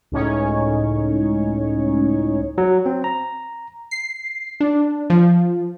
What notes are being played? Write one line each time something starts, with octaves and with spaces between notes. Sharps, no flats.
C#2 A2 C#4 D#4 C#5
F#3
C4
A#5
C7
D4
F3